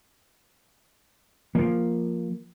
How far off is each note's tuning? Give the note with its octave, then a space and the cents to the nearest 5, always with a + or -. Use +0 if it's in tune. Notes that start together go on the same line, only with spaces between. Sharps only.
F3 +0 A#3 +0